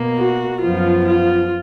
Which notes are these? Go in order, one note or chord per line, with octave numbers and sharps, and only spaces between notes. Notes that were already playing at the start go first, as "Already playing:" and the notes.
Already playing: B2 A#3
F#4
F#2 F3 B3 F4
F4